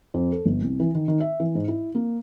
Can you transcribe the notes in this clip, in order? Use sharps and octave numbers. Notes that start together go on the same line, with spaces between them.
F2
A4
G1
C2
E3
D#3
D#3
E5
E3
G#2
E4
A#3